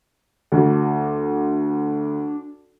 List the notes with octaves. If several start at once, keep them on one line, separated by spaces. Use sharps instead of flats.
D2 D4